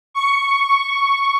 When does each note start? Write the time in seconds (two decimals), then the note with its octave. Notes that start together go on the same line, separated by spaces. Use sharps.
0.14 C#6